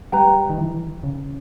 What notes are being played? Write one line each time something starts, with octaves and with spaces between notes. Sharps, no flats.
G3 B4 G5 A#5
D#3
E3
C#3